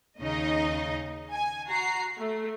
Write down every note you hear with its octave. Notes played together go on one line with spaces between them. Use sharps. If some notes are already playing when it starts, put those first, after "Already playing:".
D#2 C#3 D#4 D#5
G#5
F#4 A#5 C7
A3